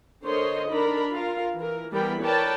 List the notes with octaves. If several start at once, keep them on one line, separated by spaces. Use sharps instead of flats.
D3 A#4 C5 C#5 D#5 C6
D4 D#4 A#4 B5
F4 A#4 F5
E3 A#4
E3 G3 B3 A#4 G5 B5
A#4 B4 C#5 D5 G5 A5